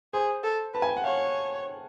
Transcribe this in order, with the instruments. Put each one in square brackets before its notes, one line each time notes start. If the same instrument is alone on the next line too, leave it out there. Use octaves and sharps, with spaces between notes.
[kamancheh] G#4 [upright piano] C5
[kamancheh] A4
[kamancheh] B4 [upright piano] A5
[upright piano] G#5
G5
F#5
[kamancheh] C#5 [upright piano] F5